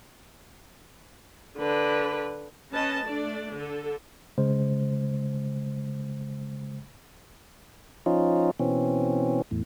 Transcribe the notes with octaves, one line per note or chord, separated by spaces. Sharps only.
D3 B4
C#4 B4 D#5 A5
A3 D4 D5
D3 A4
C#3 G#3 C5
F3 C#4 D#4 F4
B2 E3 C4 C#4
E2 A2